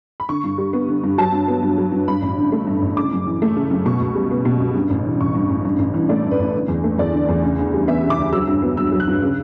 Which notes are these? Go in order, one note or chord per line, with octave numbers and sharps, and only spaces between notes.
B5
D3 C#6
G2
G3
B3
D3
G2
F#3 A5
G2
B3
G2
F#3
G2
G2 B5
A1
D3
A3
G2
A1
C#3 D6
F#2
E3
A3
C#3
F#2
B2 C#6
C#2
G3
B3
B2
C#2
G2
A1
E3
A1 C#6
G2
A1
G2
A1
E3
A3 D5
G2
B4
A1
D3
E2
A3
E2 D5
D3
E2
C#3
D2
G3
B3 E5
C#3
D6
D2
F#3 E6
G2
B3
G2 E6
F#3
F#6
G2
C#3